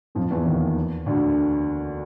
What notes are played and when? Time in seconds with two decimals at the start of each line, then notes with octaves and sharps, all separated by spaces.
0.15 F2 F3
0.30 E2 E3
0.45 D#2 D#3
1.06 D2 D3